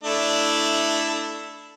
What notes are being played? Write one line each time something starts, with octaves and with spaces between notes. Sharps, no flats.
A3 D4 E4